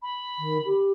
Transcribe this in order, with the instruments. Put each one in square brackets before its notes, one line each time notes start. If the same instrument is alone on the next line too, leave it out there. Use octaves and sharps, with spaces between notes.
[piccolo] B5
[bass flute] D#3
G4